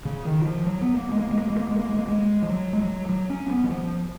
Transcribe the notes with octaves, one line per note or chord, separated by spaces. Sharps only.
C#3
D#3
F3
F#3
B3
A#3
G#3
A#3
G#3
A#3
G#3
A#3
G#3
A#3
G#3
A#3
G#3
F3
F#3
G#3
F#3
F#3
C#4
B3
F#3
F3